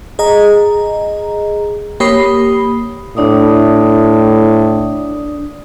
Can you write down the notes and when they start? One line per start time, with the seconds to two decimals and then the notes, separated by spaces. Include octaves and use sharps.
0.19 G#4 D#5 A#5
2.00 A#3 G4 C#5 B5 D#6 C7
3.17 A2 D4 D5 D#6